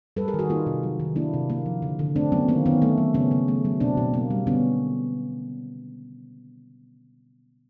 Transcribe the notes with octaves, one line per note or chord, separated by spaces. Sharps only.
G3 A4 B4
G#4 A#4
D#3
F#4 G#4
A#3 D#4 F4
C3
F#3
D#3
A#3 D4 E4
C3
A#3
F3
D3
D3
A3 C4 D4
F#3 B3 C#4
D#3 A#3 C4
D#3 B3 C#4
A3
F#3
C#3 B3 C#4
C#3
A3
F#3
B2 C4 D4
B2
A#3
G3
D3 B3 C#4